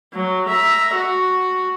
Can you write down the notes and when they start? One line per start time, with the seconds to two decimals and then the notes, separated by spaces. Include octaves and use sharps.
0.14 F#3
0.49 E5 A#5
0.94 F#4